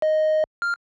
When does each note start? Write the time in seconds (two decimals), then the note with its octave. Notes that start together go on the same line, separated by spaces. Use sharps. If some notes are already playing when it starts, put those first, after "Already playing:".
0.02 D#5
0.62 F6